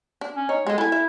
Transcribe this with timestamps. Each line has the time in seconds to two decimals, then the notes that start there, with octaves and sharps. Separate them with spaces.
0.21 D4
0.36 C#4
0.49 D#4 C#5
0.67 G#3 G#4 A4
0.78 E4 A4 G#5
0.92 E5